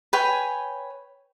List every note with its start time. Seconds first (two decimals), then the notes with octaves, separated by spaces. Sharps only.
0.13 B4 C#5 G5 G#5